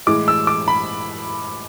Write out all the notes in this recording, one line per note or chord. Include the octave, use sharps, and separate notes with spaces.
A2 E3 G#3 D6
E6
D6
B5